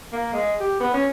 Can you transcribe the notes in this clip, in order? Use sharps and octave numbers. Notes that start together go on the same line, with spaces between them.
A#3
G#3
G4
B3
C#4